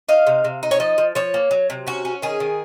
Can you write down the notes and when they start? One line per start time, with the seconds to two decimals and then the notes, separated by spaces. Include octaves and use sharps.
0.09 D#4 F5
0.27 C3
0.44 C3
0.63 D#4
0.71 C#5
0.80 F3 D#5
0.98 F3
1.15 F3 C#5
1.34 A#3
1.51 F#3
1.70 C3
1.87 C#4 F#4
2.05 C#4
2.22 D#3 G#4
2.40 D#3